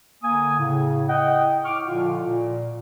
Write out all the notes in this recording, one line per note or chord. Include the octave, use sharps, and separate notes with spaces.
D3 A#3 G#5 D#6
A2 C#3
D#5 F#5 G5
A2 C#6 D6 F6
A#2 D3 F3 F4
A#2